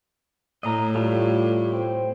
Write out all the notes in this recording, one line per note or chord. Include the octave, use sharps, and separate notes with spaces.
A2 D#5 A#5
G3 A3 F4
C4